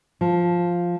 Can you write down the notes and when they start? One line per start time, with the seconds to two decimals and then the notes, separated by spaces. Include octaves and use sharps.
0.21 F3